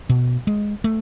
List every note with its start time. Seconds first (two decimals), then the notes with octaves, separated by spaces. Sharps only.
0.09 B2
0.47 G#3
0.84 A3